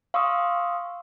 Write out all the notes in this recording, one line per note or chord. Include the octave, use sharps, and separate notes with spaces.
F5 C6 C#6 D#6 E6